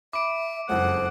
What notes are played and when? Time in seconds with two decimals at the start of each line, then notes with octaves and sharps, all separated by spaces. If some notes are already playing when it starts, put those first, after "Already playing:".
0.13 E5 B5 D6 D7
0.69 F#1 F2 G#3 C5 F#5